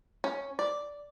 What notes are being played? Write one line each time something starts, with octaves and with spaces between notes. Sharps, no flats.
C#4
D5